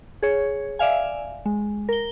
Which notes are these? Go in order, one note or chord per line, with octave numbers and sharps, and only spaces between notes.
G#4 C#5
D5 E5 F5 G#5
G#3
A#4 G7